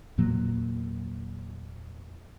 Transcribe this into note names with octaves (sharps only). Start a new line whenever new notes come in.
E2 A#2 F#3 A#3